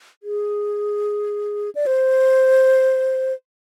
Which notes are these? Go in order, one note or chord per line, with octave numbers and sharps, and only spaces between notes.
G#4
D5
C5